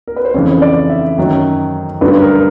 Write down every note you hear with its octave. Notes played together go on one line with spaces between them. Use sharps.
A#4
B4
C5
F2 C#3 E3 C#5
D5
E5
F#2 D#3 F#3
G2 D3 F#3 B4
A#4